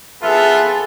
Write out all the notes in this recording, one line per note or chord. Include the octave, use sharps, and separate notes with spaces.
B3 F4 G#4 A4 E5